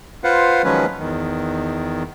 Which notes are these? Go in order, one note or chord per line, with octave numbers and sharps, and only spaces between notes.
F4 B4 C5 F5 F#5
D#3 F3 F#3 G#3 C#4 B4
E2 D#3